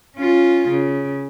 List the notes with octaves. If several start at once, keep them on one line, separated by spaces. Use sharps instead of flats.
C#4 F4
C#3